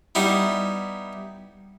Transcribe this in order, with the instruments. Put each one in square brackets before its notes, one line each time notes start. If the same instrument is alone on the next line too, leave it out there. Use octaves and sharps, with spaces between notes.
[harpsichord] G3 B3 D#4 E4